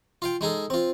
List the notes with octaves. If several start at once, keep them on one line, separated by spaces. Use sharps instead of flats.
F4 F5 G5
G#3 D#4 G#4 A4
C4 F4